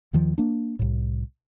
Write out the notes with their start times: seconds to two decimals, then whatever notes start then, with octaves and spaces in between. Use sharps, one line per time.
0.13 D#2 D#3 F3
0.38 A#3 D4
0.79 C2 A2